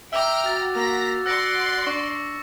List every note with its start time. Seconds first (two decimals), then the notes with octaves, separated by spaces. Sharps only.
0.13 E5 G5 A#5 D6 E6 F6
0.46 F#4 A6
0.76 A#3 A#5 A#6 B6
1.26 D5 F#5 C6 E6 A#6 C#7
1.87 D4 C#6